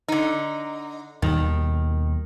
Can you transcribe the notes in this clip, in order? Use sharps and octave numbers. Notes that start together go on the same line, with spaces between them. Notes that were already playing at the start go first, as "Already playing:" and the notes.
D3 D#4
D#2 B2 D#3 G3